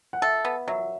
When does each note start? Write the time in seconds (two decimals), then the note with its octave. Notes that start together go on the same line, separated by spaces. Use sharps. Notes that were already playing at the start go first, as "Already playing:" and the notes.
0.13 F#5
0.22 A4 E5
0.45 B3
0.67 F#3 E5